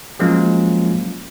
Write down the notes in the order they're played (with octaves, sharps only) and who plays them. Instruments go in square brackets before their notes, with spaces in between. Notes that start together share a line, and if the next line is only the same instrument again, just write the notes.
[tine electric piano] F3 F#3 G#3 A#3 C#4 F4